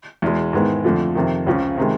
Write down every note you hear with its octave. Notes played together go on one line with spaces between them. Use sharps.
E2 B2 G#3
G#2 D#3 G#3 B3 E4
F2 D3 F3 A3
F2 C3 D#3
C#2 C#3 F3
C3 D#3 G#3